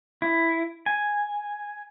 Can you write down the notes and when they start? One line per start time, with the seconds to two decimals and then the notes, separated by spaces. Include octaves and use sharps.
0.22 E4
0.86 G#5